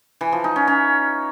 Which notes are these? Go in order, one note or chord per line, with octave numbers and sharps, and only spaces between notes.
E3
F3
D#4
C#4
C#4